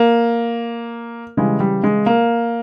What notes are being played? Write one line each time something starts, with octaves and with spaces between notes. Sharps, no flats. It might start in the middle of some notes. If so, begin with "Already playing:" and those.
Already playing: A#3
C#3 E3 G3 G#3
G3
G#3
A#3